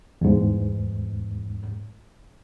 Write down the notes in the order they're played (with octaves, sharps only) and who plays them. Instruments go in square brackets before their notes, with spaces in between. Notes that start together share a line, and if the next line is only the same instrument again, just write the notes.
[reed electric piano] E2 G#2